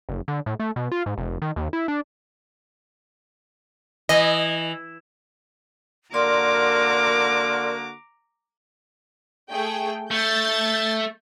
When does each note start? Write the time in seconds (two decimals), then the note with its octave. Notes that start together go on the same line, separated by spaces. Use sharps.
0.09 F#1
0.28 D3
0.46 A2
0.60 A3
0.76 B2
0.92 F4
1.06 G#2
1.18 F1
1.42 D#3
1.56 D#2
1.73 E4
1.88 D4
4.09 E3 D#5
6.14 D3 A#3 F#4 A#4 D5 A#5 C6 D6
9.49 A3 G#4 G5
10.11 A3 G6 A6